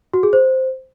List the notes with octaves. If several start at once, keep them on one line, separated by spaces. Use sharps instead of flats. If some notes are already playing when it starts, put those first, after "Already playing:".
F#4
G#4
C5